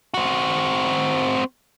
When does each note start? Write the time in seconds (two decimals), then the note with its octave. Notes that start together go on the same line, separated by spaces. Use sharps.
0.14 C4 F#4